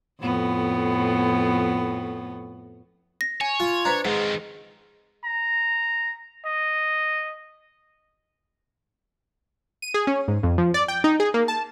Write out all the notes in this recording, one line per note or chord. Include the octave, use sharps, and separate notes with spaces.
F2 A2 B3
A#6
C#5 G#5
F4
D4 B4 C5 A#5
F2 G#2 D#3
A#5
D#5
D#7
G#4
C#4
G#2
F2
F3
D5
G5
D#4
G#4
A#3
A5